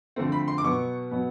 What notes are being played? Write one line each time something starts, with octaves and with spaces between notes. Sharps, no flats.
D3 F3 A3 C4
B5
C6
D6
B2 F#3 B3 C#6
B2 F#3 B3